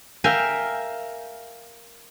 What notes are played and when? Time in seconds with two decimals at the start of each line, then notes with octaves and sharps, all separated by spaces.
0.24 A#4 E5 F5 G5 G#5